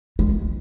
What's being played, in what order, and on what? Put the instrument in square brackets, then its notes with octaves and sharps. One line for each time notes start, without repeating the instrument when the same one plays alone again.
[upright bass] G#3